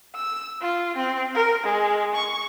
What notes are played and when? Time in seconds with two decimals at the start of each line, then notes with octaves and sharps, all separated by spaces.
0.16 E6
0.61 F4
0.96 C4
1.35 A#4
1.63 G#3
2.15 C#6